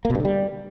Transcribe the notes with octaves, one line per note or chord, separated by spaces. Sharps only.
A#3
B2
G2
D3
G3